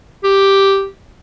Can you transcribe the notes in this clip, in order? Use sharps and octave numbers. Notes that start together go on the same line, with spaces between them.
G4